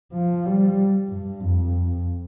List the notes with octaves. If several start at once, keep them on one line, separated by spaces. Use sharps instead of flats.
F3
G3
G2
F2